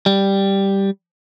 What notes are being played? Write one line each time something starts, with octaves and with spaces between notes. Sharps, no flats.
G3